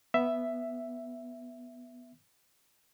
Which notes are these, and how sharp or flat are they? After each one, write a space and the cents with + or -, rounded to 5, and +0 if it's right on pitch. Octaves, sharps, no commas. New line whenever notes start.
B3 +0 E5 +5